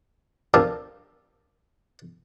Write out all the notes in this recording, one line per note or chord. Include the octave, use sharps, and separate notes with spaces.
F3 C4 D4 G4 A4 A#4